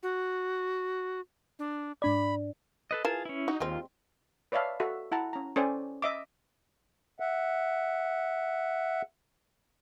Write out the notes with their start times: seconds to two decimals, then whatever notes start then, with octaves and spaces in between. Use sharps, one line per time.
0.03 F#4
1.59 D4
2.02 G#2 D4 D5 B5
2.91 A4 B4 D#5
3.05 E3 F4 G#4 A#4 A5
3.25 C#4 E4
3.48 D#4 F#4
3.60 D#2 G3 G#3 C4 F4
4.52 B4 C#5 D5 E5 F5 A5
4.80 F#4 A4 E5
5.12 E4 F#5 A5 A#5
5.33 C#4 A#5
5.56 C#4 A4 C5 D5 G5 G#5
6.02 D#5 E5 D6
7.20 E5 F#5